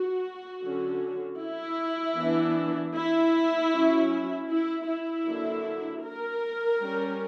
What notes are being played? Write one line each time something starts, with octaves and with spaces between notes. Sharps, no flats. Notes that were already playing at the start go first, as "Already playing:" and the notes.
Already playing: F#4
D3 F#3 C#4
E4
E3 B3 D4
E4
F#3 C#4
E4
E4
D3 F#3 A#3 D4
A#4
G3 C#4